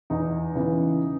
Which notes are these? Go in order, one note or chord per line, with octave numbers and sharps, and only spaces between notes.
E2 D#4
C#3 E3 B3